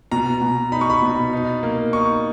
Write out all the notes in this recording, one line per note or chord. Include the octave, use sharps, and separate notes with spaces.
B2 A#5
B2
D#4 B5
C#6
B5
B2
D#4
A#3
D#4 C#6